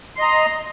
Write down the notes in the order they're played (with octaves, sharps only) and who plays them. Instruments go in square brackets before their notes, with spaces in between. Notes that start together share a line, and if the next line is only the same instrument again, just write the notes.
[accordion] C6
D#5
A#5